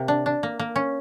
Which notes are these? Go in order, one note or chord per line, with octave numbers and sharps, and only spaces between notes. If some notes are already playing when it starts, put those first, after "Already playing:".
Already playing: C3 A#3
D4
D4
A#3
A#3
C#4